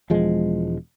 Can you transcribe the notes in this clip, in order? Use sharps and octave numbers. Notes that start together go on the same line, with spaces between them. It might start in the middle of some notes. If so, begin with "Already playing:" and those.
E1 F3 G#3